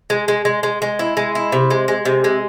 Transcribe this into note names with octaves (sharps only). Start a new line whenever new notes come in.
G#3
G#3
G#3
G#3
G#3
E4
G#3
E4
C3
G#3
G#3
C3
G#3